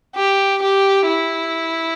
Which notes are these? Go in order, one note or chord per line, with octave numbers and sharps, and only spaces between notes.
G4
G4
E4